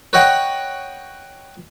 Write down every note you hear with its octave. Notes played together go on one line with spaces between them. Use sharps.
B4 C#5 D#5 F#5 G5